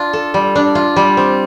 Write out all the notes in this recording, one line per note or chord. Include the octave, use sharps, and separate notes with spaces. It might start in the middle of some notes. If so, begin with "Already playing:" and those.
Already playing: D4 F4
A4
G3
D4
F4
G3
C4